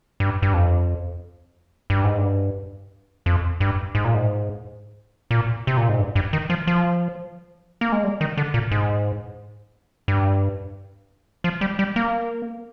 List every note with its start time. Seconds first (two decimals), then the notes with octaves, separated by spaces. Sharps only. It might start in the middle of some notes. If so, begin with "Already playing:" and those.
0.20 G2
0.42 G2
0.54 F2
1.90 G2
2.04 G#2
2.18 G2
3.26 F2
3.60 G2
3.95 G#2
4.05 A#2
4.14 G#2
5.31 A#2
5.67 C3
5.77 A#2
5.89 G#2
5.99 G2
6.16 G2
6.33 D#3
6.50 F3
6.67 F3
7.81 A#3
7.92 G#3
8.04 G3
8.21 D#3
8.37 D3
8.54 A#2
8.71 G#2
10.08 G2
11.44 F3
11.61 G3
11.79 G3
11.96 A#3